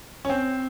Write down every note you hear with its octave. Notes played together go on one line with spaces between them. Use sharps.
C#4
C4